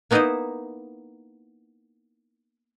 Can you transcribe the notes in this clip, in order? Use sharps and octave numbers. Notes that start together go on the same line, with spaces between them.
A#3 B3 D#4 E4 C5 D#5